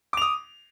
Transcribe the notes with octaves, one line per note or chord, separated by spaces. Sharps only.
D6 D#6 F7